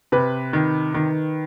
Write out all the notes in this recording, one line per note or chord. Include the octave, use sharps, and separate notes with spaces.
C3 B4
D#3
D#3